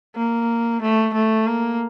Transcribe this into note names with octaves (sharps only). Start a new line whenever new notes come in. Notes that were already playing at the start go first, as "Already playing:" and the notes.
A#3
A3
A3
A#3